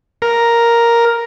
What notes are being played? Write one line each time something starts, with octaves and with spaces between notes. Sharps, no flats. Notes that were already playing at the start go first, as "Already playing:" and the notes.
A#4